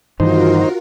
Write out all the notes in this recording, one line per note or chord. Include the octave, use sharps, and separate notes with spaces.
G2 D#3 E3 D#4 F4 F#4 A#4 C5